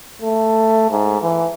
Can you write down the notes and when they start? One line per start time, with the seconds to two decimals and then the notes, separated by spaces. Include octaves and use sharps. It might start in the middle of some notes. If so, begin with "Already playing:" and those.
0.22 A3
0.91 G#2
1.22 E3